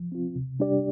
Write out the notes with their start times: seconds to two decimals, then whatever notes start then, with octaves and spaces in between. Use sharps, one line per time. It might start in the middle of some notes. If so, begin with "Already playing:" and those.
Already playing: F3
0.12 C4 F4
0.35 C3
0.59 G3 D4 G4 D5